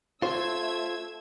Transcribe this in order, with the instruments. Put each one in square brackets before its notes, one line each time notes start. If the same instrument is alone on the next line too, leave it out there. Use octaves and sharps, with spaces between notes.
[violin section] A3 E6 G#6 [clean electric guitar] F4 C5